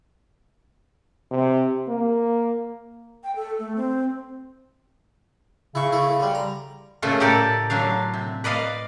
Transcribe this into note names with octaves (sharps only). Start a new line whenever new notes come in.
C3
A#3
G5
A4
A3
C4
C#3 E4 C#6
A3 E4
D3 G3
A#5
A#2 C#3 A3 F4 A4
A2 G4 A4 A#4 D5
D3 F#3 D4 F5
C3
B4 D5 D#5 F5